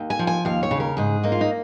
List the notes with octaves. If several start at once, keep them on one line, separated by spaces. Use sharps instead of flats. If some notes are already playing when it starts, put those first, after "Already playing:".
Already playing: D#2
G#5
F3
G#5
D#2 F5
C#5
C#3
A#4
G#2 G#4
A#3 D#4
F4
D#4